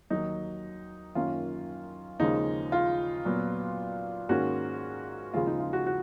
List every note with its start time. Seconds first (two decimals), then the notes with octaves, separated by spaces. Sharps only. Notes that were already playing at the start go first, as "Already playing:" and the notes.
0.10 D#2 D#3 F#3 D#4
1.15 F#2 D#3 A#3 C#4 F4
2.19 D#2 C#3 F3 G#3 C#4 D#4
2.72 F4
3.25 A#2 F#3 B3
4.29 G#2 D#3 A#3 C#4 F#4
5.34 D#2 C#3 F3 G#3 F4
5.47 D#4
5.60 F4
5.73 F#4
5.87 F#4